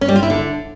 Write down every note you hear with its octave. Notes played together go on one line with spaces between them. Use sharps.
C#4
G3
F4
E4
D3